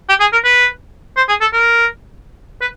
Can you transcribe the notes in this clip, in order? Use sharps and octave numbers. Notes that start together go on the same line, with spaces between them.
G4
G#4
A#4
B4
C5
G#4
A4
A#4
B4